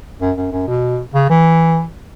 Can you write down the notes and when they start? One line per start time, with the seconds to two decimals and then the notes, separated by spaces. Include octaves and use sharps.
0.21 F#2
0.37 F#2
0.52 F#2
0.68 B2
1.15 C#3
1.29 E3